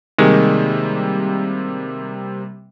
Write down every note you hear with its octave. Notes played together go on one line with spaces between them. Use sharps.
C3 D#3 G3 G#3 A#3